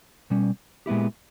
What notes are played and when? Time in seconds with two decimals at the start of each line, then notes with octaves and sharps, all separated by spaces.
0.30 B2 G3 C#4
0.86 A#2 G#3 B3 E4 G4